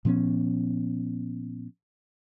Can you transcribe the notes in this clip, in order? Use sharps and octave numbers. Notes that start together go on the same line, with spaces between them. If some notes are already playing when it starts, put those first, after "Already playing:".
A#2 F3 B3 C#4